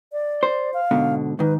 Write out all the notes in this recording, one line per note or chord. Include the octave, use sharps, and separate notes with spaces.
D5
C5
F5
G#2 B2 D3
G#2 D#3 B4